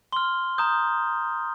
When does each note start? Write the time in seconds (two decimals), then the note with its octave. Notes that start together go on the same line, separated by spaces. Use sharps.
0.12 C6 F6 G7
0.58 A#5 D#6 G6